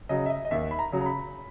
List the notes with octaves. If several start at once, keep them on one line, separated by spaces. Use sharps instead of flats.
C#3 F#3 D#5
E5
D#5
D#5
D#2 E5
B5
A#5
C#3 F#3
A#5
B5